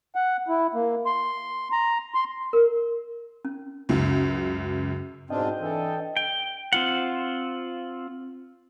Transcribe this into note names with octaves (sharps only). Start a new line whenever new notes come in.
F#5
E4
A#3
C6
A#5
C6
A#4
C#4
C#2 F#2
G#2 B2 C4 D4 F4 D#5 G5
E3 D4 A4
G5
C4 F4 F#5